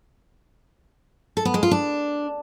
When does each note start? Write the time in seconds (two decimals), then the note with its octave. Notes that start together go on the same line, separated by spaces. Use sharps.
1.37 A4
1.45 B3
1.54 G#3
1.63 F4
1.71 D4